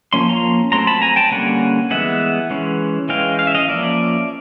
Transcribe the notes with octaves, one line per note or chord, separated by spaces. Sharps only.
F3 A#3 C#4 C6
A#5 C6
F#3 A3 C4 A#5 C6
A5 B5
G#5 A#5
G5 A5
D3 G3 A#3 C#4 F#5 G#5
E3 G#3 B3 E5 F#5
E3 G#3 C#4
E3 G#3 C#4 F5 G5
F5
E5
D#5 F5
F3 A#3 C#4 D5 E5